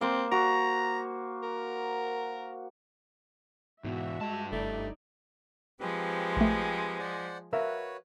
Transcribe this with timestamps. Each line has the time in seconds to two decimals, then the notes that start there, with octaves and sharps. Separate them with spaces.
0.01 A#3 C4 C5
0.32 F#4 A#5
1.43 A#4
3.84 E2 G#2 B2 F#4 E5
4.21 G2 G#3 A5
4.52 F#1 A3 D#4 E4 D5
5.80 F3 G#3 C4 G4 B4
6.37 A#1 A3
6.99 C5 D5 F#5
7.53 F#4 A#4 B4 C#5 E5 F5